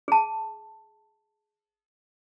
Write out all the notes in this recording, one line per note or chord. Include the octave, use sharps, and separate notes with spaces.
G#4 A5